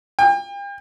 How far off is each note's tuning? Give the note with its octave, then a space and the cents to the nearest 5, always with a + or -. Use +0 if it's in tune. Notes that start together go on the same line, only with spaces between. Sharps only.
G5 +40